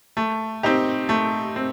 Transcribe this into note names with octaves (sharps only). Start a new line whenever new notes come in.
A3
C4 D#4 G4
A3
C4